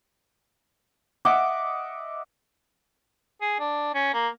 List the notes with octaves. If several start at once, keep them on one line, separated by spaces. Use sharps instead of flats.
D#5 E5 F#5 D6
G#4
D4
C#4
A#3